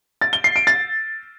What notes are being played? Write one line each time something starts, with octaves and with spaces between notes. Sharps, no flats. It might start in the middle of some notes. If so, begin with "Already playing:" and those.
A6
G7
C7
D7
A6